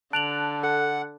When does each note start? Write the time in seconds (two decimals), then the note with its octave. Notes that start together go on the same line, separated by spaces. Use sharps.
0.13 D3 A5 F#6 D7 F7 F#7
0.63 A4 F#5 F#6